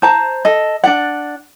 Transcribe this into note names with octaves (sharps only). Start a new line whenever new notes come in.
C5 A5 A#5
A4 D#5
D4 D5 F#5